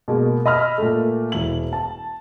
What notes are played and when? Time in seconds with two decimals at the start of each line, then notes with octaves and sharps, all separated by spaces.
0.08 B2 G#3 A#3
0.46 D#5 B5 E6 F6
0.78 A#2 A3
1.32 E1 E4 F#7
1.73 A5